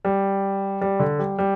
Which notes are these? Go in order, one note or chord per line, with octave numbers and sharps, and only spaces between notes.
G3
G3
D3
G3
G3